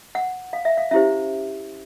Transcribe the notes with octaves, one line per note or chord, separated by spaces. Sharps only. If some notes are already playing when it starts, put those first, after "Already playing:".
F#5
F5
E5
F5
C#4 E4 G4 C5 E5